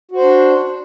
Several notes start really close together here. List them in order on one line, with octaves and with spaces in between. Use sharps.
F#4 C5 D4